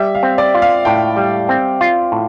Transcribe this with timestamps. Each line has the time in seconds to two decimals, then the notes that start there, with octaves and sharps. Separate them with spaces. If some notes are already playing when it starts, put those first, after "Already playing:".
Already playing: G3 E5
0.15 F5
0.23 C4
0.38 D5
0.55 F4
0.62 F5
0.85 A2 G5
1.17 G3
1.49 C4
1.81 F4
2.12 A2